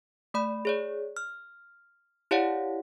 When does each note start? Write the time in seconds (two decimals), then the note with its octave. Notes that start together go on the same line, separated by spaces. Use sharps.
0.34 A3 D5 B5
0.65 G#4 C#5 D5
1.17 F6
2.31 E4 G4 C#5 D5 F5 F#5